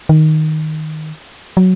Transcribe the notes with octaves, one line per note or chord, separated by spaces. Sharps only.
D#3
F#3